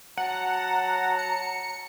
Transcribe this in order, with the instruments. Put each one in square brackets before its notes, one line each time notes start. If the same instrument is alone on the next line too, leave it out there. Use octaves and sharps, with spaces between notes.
[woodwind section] F#3 A5 A#5 [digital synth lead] F#5
[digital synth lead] C#7